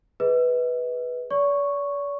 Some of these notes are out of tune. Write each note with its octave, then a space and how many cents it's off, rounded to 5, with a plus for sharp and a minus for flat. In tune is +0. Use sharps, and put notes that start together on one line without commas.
G#4 +0 B4 +0 D#5 +35
D5 -45 C#6 +0